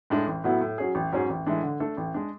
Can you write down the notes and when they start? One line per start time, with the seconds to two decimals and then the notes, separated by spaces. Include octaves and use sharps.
0.10 A2 G#3 D4 G#4
0.27 A1
0.44 A2 F#3 B3 E4
0.61 A2
0.78 F#3 C#4 G#4
0.95 A1
1.12 G#2 F#3 C#4 G#4
1.29 A1
1.46 A2 E3 G#3 D4
1.63 D3
1.80 A3 D4 A4
1.97 A1
2.14 G#3 D4